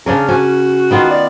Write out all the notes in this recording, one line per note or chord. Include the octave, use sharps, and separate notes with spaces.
C#3 C#4 D4 A#4
C#4 F#4
D#3 B3 F4
D5